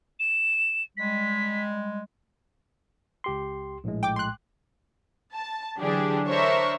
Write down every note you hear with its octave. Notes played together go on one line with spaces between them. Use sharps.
E7
G3 G#3 B6
C#2 G4 C6
A#1 A2 G#3
G5 D6
C6 F#6
A5
D3 E3 F#3 D4 G4 G#4
D4 A#4 C5 C#5 E5 C#6